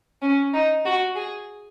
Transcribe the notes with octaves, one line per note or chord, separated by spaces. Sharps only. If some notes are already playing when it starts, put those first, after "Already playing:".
C#4
D#4
F#4
G#4